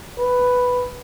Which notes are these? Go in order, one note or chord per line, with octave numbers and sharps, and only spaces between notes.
B4